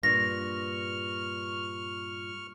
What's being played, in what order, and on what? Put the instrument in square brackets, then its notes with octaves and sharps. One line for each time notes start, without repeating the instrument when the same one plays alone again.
[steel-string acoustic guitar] G2 A#2 [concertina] C#6 F6 [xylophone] A#6